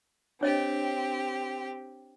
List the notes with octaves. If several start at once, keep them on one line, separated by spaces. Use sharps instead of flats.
C4 D4 G4 C#5 D#5